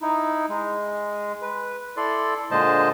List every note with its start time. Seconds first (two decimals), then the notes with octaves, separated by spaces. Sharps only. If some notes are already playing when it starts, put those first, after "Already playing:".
0.01 D#4 E4
0.49 G#3
1.42 B4
1.97 E4 A4 D5 C6
2.51 A#2 D3 G#3 C5 D#5 A5